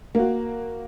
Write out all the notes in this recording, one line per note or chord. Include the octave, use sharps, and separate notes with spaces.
A#3 F#4